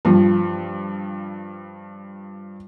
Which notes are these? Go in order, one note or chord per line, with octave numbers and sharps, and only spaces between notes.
G2 F3